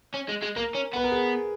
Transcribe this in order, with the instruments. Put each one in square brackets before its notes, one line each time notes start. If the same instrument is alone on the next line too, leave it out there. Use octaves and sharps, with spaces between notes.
[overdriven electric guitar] C#4
G#3
G#3
[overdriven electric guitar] A#3 [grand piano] A#4
[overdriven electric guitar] C#4
[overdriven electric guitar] B3 [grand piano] B4
[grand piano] A#4
G#4